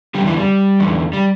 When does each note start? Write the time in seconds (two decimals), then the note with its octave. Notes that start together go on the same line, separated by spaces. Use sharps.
0.14 D3 G3
0.19 E2
0.26 E3
0.37 G3
0.80 E2 D3
1.13 G3